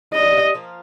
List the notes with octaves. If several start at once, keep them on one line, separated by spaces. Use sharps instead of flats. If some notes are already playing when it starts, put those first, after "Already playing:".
G3 D4 G4 A#4 D#5
F3 A#3 F4 A#4